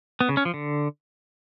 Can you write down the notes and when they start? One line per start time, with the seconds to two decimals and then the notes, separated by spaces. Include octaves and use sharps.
0.21 B3
0.29 C#3
0.37 C#4
0.45 F3
0.54 D3